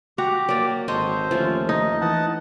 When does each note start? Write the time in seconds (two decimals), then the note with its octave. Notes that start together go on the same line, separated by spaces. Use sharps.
0.18 F#4 G4 A#5
0.49 F#3 A#3 D5
0.88 G#1 A4 C5 C#5 D#5
1.31 D#2 F3 A3 C#4
1.69 D#4 D#5
2.01 E3 D#5 F#5 A5